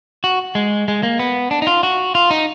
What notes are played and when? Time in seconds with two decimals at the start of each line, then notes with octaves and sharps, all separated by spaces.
0.24 F#4
0.55 G#3
0.88 G#3
1.03 A#3
1.19 B3
1.51 D4
1.62 D#4
1.67 F4
1.83 F#4
2.15 F4
2.31 D#4